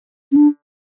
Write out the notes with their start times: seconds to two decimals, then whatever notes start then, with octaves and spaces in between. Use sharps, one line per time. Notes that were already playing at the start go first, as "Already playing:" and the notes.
0.32 C#4
0.36 D4